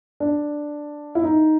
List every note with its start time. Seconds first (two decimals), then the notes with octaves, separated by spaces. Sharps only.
0.20 D4
1.15 E4
1.24 D#4